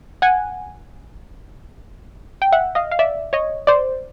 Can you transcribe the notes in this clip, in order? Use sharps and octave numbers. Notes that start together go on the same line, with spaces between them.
F#5 G#5
G5
E5 F#5
D#5 F5
F5
D5 E5
C#5 D#5
C5 D5